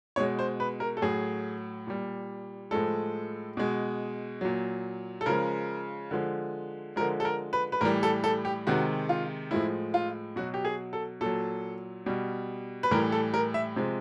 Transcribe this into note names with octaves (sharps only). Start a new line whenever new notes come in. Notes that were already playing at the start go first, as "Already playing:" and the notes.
B2 G#3 C#5
C5
B4
A#4
A4
A2 F#3 G#4
A#2 G3
A2 F3 G#3 A4
B2 G#3
A#2 F#3
A4
C#3 F3 G#3 A#4
D3 F3 G#3
D3 F3 G#3 A#4
A4
A#4
B4
B4
A2 E3 G3 A#4
A4
A4
G4
C3 D#3 G#3 F#4
F4
A2 F3 G#3 E4
F4
B2 F#3 F#4
G4
G#4
A4
A#2 F#3 A4
B2 G3
B4
A2 E3 G3 A#4
A4
A#4
E5
C3 F3 G#3